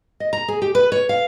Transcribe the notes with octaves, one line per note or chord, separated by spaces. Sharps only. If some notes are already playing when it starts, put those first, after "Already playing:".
D#5
A#5
G#4
G4
B4
C#5
F5